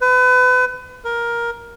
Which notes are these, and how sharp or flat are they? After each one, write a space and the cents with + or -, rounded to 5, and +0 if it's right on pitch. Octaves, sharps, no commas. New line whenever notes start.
B4 +35
A#4 +10